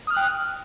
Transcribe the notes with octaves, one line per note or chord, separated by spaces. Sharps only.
G5 D#6 F6 F#6